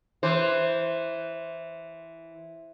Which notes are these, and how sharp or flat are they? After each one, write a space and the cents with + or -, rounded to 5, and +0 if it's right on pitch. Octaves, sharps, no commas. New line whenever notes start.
E3 +0 C5 +0